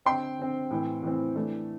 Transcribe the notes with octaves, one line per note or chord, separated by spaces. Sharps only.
D3 C4 G5 C6
D3 C4
A2 E3 C4
A2 E3 C4
E3 A3 D4